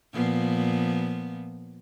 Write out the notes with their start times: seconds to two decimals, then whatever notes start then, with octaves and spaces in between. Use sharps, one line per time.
0.13 A#2 F3 B3